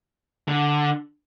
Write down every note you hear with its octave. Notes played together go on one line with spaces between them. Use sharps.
D3